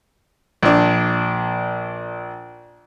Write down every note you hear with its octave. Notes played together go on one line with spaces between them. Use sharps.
A#1 D4